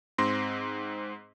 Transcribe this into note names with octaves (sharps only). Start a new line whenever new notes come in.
G#2 C4 C6 A#6